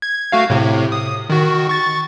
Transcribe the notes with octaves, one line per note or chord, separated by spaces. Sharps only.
G#6
A3 F#4 F5
A2 C3
D#6
D#3 F#4
C#6 A6